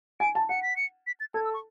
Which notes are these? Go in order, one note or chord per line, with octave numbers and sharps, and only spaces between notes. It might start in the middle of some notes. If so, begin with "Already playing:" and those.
G#5 D7
A5
F#5 C#7
B6
C#7
B6
A6
A4 G#6
E6
C#6